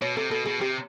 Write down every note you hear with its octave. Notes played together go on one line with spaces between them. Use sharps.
B2 C#5
C3 A4
B2 A4
B2 G#4
C3 G4